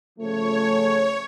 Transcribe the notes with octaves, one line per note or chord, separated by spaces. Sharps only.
C#3 F3 A3 C#5